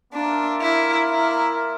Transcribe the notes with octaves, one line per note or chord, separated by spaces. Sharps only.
A#3 D4 F4 A#4 E5
E4
E4